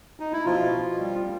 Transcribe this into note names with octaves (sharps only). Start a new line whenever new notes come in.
D#4
E4
B2 F3 F4
B2
G3